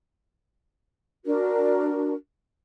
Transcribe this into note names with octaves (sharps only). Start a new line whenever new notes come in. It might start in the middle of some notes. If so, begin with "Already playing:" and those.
D4 F#4 A#4